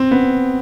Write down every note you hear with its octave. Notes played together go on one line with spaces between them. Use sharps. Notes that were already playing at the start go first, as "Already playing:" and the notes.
Already playing: C4
B3